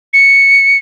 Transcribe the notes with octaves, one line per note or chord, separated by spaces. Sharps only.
C#7